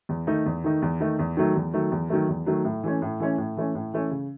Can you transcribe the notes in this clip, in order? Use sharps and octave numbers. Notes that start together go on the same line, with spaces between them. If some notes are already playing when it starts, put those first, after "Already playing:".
E2
D#3 A3 D#4
E2
D#3 A3 D#4
E2
D#3 A3 D#4
E2
D#3 F#3 A3
E2
D#3 F#3 A3
E2
D#3 F#3 A3
E2
D#3 F#3 A3
A2
E3 A3 C#4
A2
E3 A3 C#4
A2
E3 A3 C#4
A2
E3 A3 C#4
C#3